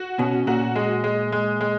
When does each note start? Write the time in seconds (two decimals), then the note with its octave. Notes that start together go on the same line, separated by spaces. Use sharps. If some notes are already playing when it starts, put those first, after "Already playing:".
Already playing: F#4
0.18 B2 C#4
0.47 A#2 F#4
0.76 G#3
1.04 G#3
1.32 G#3
1.61 G#3